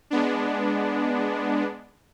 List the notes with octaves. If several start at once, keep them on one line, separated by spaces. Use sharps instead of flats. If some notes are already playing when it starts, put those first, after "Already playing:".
G#3 B3 D4